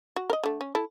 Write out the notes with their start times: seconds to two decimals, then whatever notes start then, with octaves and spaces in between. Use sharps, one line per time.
0.16 F#4
0.30 A#4 D#5
0.44 D3 A3
0.61 C#4
0.75 E4 A4